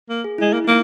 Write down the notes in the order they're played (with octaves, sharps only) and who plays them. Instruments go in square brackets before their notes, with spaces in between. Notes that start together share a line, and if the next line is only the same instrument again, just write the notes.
[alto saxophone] A#3
[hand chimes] G#4
[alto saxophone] G#3 [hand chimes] E4
[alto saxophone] A#3 [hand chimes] E4
[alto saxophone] A#3 [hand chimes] D#4